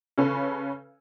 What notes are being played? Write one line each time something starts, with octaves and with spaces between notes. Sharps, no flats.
C#3 C#4 A4 B4